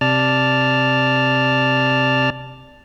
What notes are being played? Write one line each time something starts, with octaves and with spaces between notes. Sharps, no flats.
C3 D5 A5 F6